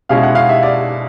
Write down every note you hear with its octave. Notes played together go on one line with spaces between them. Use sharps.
B2 G#3 C#4 E4 F5
F#5
F5
E5
D5